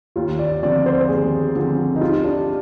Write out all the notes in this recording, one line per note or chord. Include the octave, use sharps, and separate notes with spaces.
D#2 F4
D5
D3 F3 C4 D5
C5
D#2 G#4
D3 F3 C4
D#4
G3 F4
D4